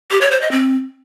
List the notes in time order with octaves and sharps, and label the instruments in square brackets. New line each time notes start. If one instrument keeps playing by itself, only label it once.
[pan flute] G4
C#5
C5
D#5
C4